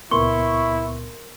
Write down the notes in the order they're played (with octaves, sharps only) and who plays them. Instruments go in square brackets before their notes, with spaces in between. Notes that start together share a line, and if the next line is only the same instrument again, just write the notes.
[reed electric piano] C#2 A#2 B3 [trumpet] E4 [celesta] A#4 C6 G7 [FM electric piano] C#6